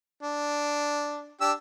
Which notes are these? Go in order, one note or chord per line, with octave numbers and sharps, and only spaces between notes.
D4
D4 G4 E6